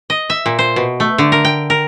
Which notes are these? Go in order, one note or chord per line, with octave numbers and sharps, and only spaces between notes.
D#5
E5
A#2
C5
B2
A3
D3
A#4
G5
A#4